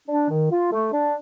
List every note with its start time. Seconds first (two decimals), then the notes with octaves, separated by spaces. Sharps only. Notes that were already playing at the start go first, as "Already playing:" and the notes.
0.08 D4
0.30 D#3
0.51 F4
0.72 A3
0.93 D4